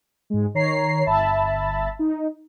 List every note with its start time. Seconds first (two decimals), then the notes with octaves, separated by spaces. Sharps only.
0.30 G#2 G#3
0.54 D#3 C#5 A#5 C7
1.06 G1 E5 A5 B5
1.99 D#4